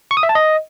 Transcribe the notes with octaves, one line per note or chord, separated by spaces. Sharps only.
C#6
D#6
E5
A5
D#5